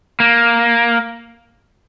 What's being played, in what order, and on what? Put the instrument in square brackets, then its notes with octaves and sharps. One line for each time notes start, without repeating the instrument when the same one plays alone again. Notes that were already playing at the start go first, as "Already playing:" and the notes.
[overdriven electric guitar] A#3